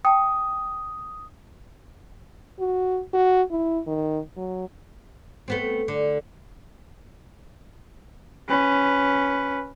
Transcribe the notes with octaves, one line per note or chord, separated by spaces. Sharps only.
G5 A5 D#6
F#4
F#4
E4
D#3
F#3
A3 B3 C4
D3
C#4 B4